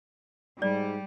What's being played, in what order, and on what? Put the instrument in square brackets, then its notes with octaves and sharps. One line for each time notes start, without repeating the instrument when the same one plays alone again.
[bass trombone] G#2 [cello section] G3 [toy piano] D5